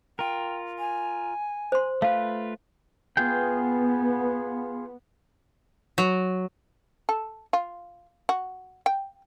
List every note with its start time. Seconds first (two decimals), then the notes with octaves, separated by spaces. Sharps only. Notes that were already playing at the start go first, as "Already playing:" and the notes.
0.19 F4 A#4 G5
0.79 G#5
1.72 C5 C6
2.02 A3 F4 B4 F5
3.17 B3 F4 G#4 G5
5.98 F#3
7.09 A4
7.53 F4
8.29 F#4
8.86 G5